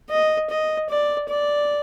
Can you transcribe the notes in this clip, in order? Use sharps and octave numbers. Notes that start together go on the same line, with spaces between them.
D#5
D#5
D5
D5